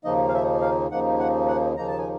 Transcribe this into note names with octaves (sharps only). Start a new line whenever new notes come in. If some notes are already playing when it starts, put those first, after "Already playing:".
D#2 C#3 F3 A#3 D#4 D#5
F5
E5
F5
D#2 C#3 F3 A#3 D#4 F#5
F#5
F#5
D#2 C#3 F3 A#3 D#4 A#5
A5
G#5